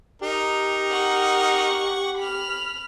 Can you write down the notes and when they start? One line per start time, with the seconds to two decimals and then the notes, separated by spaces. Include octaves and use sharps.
0.22 D#4 G4 A#4
0.90 F#5 C#6
2.17 B5 F6